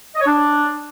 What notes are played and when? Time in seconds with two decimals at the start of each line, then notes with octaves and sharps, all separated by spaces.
0.15 D#5
0.21 C#5
0.26 D4